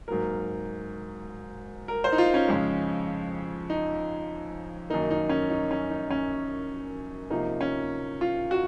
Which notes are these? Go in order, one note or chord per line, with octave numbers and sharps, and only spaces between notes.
G#2 F#3 A#3 A#4
A#4
C5
D#4
F4
C#4
F2 C#3 G#3
D#4
F#2 D#3 A#3 D#4
D#4
C#4
D#4
C#4
D#4
C#4
C3 F3 A#3 D#4
C#4
F4
F#4